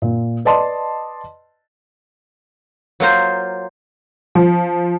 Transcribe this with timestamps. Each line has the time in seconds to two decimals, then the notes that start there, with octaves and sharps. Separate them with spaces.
0.02 A#2
0.45 B4 D5 D#5 A5 C6
3.00 F#3 A#3 F4 C5
4.35 F3